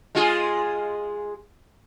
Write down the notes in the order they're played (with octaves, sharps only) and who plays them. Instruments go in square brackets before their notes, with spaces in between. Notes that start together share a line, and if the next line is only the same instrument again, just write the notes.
[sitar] G#3 F4 G#4